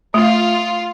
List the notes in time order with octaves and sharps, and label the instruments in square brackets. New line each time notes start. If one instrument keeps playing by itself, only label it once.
[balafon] A3 [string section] F4